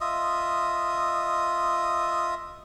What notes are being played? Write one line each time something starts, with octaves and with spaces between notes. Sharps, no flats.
F4 D#5 E5 D#6